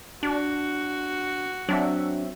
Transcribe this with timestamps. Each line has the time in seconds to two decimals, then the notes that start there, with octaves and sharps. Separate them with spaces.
0.23 D4 F#4
1.69 F#3 C4 D4 E5